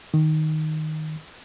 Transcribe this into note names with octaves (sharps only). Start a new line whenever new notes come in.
D#3